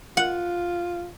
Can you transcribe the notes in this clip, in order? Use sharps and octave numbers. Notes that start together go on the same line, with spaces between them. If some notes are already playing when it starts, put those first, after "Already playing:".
F4 F#5